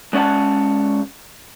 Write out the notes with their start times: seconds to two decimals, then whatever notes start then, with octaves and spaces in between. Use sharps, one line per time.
0.13 G#3 C#4 D5 F#5 A5